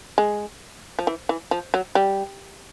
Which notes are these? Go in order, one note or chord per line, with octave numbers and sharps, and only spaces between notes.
G#3
F3
E3
E3
F3
F#3
G3